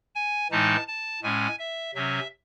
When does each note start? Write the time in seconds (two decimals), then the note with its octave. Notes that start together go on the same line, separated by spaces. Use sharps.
0.15 G#5
0.51 A2 E3 G#3 D#4 A5
0.88 A5
1.22 A2 G#3 C#4 G#5
1.59 E5
1.95 C3 F#3 C#4 E5